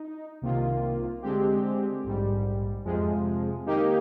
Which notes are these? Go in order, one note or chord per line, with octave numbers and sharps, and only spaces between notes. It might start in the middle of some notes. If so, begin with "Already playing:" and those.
Already playing: D#4
C2 C3 D#3 A#3 F4
D3 G#3 C4 G4
A#1 G#2 G3
F2 C3 F3 G#3
D#3 A#3 D#4 G4